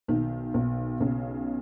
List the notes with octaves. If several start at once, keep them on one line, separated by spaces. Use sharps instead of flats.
B1 D#3
B1
B1 C#3